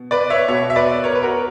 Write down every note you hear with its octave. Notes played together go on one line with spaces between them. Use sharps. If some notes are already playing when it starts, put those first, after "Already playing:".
Already playing: B2
B4 D5
C#5 E5
B2 C#5 E5
E5
B4 D5
A#4 C#5
B4
F#4 A#4